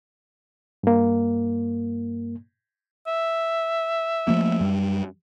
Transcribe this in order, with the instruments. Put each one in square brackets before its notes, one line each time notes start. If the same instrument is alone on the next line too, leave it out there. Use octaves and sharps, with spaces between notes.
[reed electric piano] G2 A#3
[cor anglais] E5
[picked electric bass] F3 A3 A#3
F#2 G3